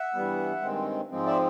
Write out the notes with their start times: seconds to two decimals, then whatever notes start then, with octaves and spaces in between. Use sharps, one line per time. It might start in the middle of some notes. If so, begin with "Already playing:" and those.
Already playing: E5 F#5
0.14 G2 E3 G3 B3
0.62 G2 D#3 G#3 C4
1.11 G#2 F3 G#3 C4
1.26 D5 E5